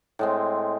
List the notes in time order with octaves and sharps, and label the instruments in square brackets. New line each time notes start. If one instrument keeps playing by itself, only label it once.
[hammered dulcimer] A2 G#3 C4